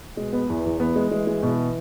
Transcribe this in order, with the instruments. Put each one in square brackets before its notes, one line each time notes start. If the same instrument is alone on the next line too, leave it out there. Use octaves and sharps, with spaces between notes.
[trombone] B2 [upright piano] G#3
[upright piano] B3
[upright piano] E2 [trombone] E3
[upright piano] E2
[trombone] E3 [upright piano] B3
[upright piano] G#3
[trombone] E3 [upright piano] G#3
[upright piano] G#3
[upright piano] B2 [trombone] E3